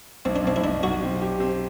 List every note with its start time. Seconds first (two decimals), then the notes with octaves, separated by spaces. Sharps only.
0.25 B1 C4
0.36 D4
0.44 B1 C4
0.56 E4
0.64 B1 D4
0.83 B1 F#4
1.02 C4
1.22 G4
1.40 C4